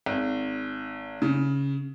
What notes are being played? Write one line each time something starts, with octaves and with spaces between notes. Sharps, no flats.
G#1
C#3